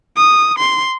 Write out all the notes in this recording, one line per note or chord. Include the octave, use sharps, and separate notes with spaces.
D#6
C6